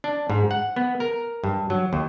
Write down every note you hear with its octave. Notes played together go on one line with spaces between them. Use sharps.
D4
G#2
F#5
B3
A#4
G2
F#3
D#2